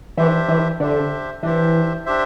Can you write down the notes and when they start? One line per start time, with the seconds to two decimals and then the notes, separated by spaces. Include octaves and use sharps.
0.17 E3 D4 G4 C5 E5
0.49 E3
0.80 D3 D4 G4 C5 E5
1.42 E3 D4 G4 C5 E5
2.06 D4 G4 C5 E5